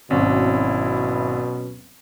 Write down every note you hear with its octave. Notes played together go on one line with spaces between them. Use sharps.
G#1 B2 F#3 C4 C#4 E4